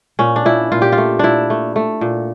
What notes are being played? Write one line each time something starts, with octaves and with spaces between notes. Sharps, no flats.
A#2 C#4
D4
A#2 E4
A#2 F4
G4
F4
A3
A#2 D4 E4
A3
A3
A#2